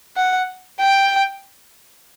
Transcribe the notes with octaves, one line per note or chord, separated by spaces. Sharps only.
F#5
G5